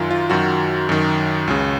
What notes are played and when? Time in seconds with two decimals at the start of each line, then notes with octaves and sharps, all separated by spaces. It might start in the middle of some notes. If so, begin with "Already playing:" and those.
Already playing: F#2 D#3 F4
0.11 F4
0.30 F#2 D#3 F#4
0.89 F#2 D#3
1.48 C#2 C#3